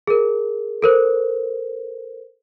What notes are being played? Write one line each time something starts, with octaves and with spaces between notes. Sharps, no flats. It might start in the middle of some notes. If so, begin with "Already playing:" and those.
G#4 A#4
A4 A#4 C5